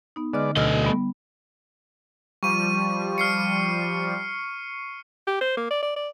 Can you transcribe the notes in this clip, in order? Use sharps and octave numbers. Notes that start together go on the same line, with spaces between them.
B3 D#4
D3 G#3 B3 D5 D#5 F6
D2 B2 A3 D#5 E6 F6
G3 B3
F3 G3 C#6 D#7
F6 C7 C#7
G4
C5
A#3
D5
D5
D5